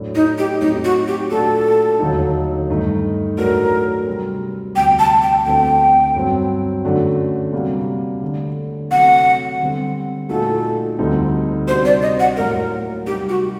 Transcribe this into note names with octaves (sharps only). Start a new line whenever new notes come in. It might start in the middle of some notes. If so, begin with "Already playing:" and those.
Already playing: A2 F#3 A3 D4
D#4
G4
A2 F#3 C4 D#4
F#4
G4
A#2 A3 D4 F#4 A4
D#2 D3 F#3 A3 D#4
G2 D#3 A3 D#4
A2 F#3 A3 D4 F#4 A#4
C3 G3 C4 F#4
D2 C3 G3 G5
A5
G5
D2 D3 A3 C4 G5
G2 F#3 C4
F#2 D3 A3 D4 F#4
C3 G3 A#3 D4 F#4
D3 A3 D4
C3 F#3 A3 F#5
D3 G3 C4
A#2 A3 D#4 F#4 A4
D2 D3 G3 C4 D#4
C3 G3 D4 F#4 C5
D5
D#5
F#5
A2 F#3 A#3 A#4
C3 G3 C4 D#4 G4
F#4